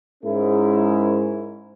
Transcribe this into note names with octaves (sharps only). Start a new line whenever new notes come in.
G#2 G#3 C#4 E4 A#4